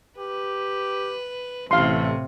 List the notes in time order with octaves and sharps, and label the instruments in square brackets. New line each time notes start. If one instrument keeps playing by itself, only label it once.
[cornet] G4 [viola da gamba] B4
[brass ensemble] A1 [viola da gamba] A2 C3 [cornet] A3 [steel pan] F5 C6